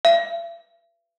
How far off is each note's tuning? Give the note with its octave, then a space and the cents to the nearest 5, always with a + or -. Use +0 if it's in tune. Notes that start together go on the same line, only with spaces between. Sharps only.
E5 +45